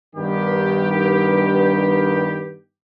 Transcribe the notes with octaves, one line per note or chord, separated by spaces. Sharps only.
G2 D#3 B3 G4